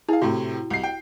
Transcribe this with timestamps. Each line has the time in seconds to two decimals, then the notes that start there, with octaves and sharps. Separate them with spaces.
0.09 E4 G#4 F5
0.22 A2 C3 F#4
0.71 C2 C7
0.83 G5